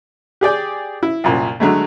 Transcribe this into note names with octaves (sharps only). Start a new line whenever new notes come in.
G4 G#4 D5 G5
E4
C2 F#2 A#2
D3 F#3 G#3 A3